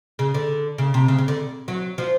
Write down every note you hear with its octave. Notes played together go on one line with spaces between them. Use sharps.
C#3
D3
C#3
C3
C#3
C#3
D3
F#3
F3